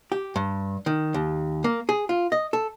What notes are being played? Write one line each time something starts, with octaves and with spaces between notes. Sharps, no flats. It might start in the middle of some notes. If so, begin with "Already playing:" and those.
G4
G2
D#3
D#2
A#3
G#4
F4
D#5
A4